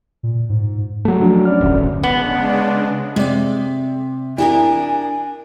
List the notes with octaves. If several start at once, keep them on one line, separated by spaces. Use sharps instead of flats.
A#2
G#2
F#3 A3
F3 D4 F#4
C#4 D5 F6
D1 G1 D2
C#3 G#3 B3 D4
C3 G#3 D5
D4 E4 G4 A#4 G#5